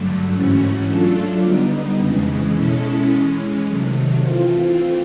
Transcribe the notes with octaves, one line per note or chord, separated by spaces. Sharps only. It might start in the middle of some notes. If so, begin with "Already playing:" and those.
Already playing: G2 D3 F#3 A3
G#2 E3 A3 C#4 F#4
F#3 A3 D4 F4 A4
D3 G3 B3 D#4
F2 C#3 E3 G#3
B2 G#3 C#4 E4 A4
E3 G#3 C#4
C3 D#3 F#3 A3
E3 A3 C4 F4